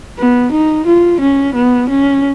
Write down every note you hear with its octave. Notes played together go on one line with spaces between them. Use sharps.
B3
D#4
F4
C#4
B3
C#4